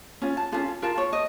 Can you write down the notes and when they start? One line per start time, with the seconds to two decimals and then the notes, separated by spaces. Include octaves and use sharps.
0.22 C#4 F4
0.37 A5
0.52 C#4 F4 A4
0.82 F4 A#4 A5
0.98 C#5
1.13 D#5